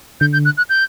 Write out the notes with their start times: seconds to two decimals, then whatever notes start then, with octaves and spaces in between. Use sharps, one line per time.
0.21 D3 G6
0.33 G6
0.45 F#6
0.57 F#6
0.69 G6